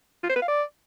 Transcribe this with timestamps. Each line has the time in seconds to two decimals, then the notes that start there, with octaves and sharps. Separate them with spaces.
0.23 F4
0.29 C5
0.36 B4
0.42 F5
0.48 D5